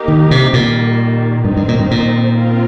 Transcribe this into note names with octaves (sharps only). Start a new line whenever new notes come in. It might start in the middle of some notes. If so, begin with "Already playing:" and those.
Already playing: A#3 D#4 G4 A#4
D#3
C3
A#2 D#3 G3 A#3
G2 D#3 C4 D#4
G2
A#2
G2
A#2
D#3 C4 F4 A#4